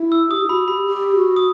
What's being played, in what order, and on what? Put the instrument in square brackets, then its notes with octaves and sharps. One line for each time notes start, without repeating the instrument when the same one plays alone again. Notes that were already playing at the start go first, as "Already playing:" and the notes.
Already playing: [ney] E4
[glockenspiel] E6
[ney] G4 [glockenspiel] D#6
[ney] E4
[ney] F#4 [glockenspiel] B5
[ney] G4 [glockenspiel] B5
[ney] G4
F#4
[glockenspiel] D#6